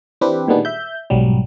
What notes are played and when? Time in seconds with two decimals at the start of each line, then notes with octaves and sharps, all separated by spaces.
0.21 E3 C4 D4 G4 B4
0.48 A#2 D#3 G3 G#3 B3 D4
0.65 E5 G6
1.10 B1 G#2 F#3 G3